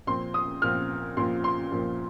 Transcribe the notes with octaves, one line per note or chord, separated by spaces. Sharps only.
A#2 F3 C4 C6
D#6
A#2 F3 C4 F6
A#2 F3 C4 C6
C6
A#2 F3 C4